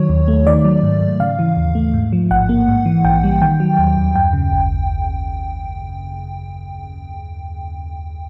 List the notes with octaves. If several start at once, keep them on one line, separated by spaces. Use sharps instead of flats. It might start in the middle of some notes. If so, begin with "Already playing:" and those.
Already playing: D#3 F#3 C#5
D#2
A3
D#3 D5
F#3
G#2
G#2
C#3 F5
E3
D#2
A3
G#2
F3
A1 F#5
A#3
G#2
E3
A#1 G5
G3
D#3 G5
F#3
D#2
D#2
F#2 G5
C#3
G#1